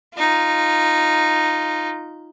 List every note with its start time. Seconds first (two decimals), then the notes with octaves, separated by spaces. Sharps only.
0.17 D#4 F4